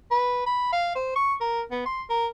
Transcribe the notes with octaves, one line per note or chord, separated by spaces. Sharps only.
B4
B5
F5
C5
C#6
A#4
B3
C6
A#4